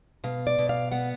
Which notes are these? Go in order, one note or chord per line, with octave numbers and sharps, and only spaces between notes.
B2 F5
D5
B2
F5
B3 F#5